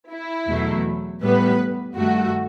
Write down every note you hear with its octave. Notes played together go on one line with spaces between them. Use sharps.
E4
E2 B2 F#3 A3
A2 G3 B3 B4
G2 D#3 A3 F#4